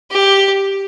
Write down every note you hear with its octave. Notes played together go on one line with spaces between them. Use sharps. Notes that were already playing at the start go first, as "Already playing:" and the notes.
G4